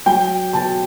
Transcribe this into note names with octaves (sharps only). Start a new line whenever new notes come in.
F#3 G5
B2 A5